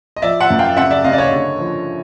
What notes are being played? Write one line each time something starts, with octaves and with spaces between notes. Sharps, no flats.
D#5
F3 D5 E5
E5 F#5
F#2
F5 G5
C#3 E5 F#5
D5 E5
C#3 D#5 F5
D5
C#5 D#5
D3
F3